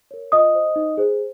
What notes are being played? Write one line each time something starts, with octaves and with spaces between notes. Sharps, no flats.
A#4 C#5
F4 D#5 D#6
C5
D#4
G#4 C5